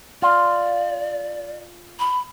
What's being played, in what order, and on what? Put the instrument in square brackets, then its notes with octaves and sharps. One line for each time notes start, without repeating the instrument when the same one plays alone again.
[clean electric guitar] F4 [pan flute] D5
[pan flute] B5